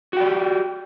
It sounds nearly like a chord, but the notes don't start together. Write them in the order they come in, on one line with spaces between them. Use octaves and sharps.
F#4 G5 D5 G4